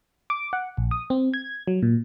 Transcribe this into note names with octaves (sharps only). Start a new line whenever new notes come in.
D6
F#5
A#1
D#6
C4
G#6
F#3
A#2